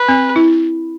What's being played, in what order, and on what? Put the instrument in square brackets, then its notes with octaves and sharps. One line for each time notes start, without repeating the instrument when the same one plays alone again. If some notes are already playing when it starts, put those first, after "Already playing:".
Already playing: [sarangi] B4
[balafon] C4
E4